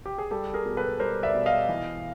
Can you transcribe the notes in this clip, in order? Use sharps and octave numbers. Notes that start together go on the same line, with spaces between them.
G4
G#4
G3 G4 A4
G#4 A#4
B2
A4 B4
G3 A#4 C5
D5 E5
B2
D#5 F5
E3